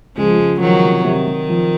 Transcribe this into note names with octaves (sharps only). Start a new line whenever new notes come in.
C#2 F3 G#3
C#2
D#3 F3 F#3
C3
C3 D#3
C3
F3